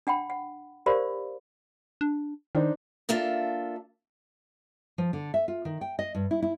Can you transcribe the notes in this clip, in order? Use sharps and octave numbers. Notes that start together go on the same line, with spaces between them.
D4 F#5 G5 B5
F#5
G4 A#4 C5 D5 F5 B5
D4
D#3 D4 D#4 C5
A#3 D4 F4 A4 E5
F3
D3
E5
F4
D#3
G5
D#5
G2
E4
E4